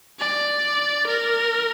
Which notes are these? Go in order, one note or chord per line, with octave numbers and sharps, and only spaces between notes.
D5
A#4